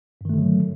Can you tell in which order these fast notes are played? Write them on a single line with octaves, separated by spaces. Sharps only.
G2 D#3 A3 D3 F#3